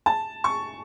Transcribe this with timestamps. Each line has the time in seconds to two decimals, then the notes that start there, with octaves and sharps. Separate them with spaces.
0.06 A5
0.44 C#6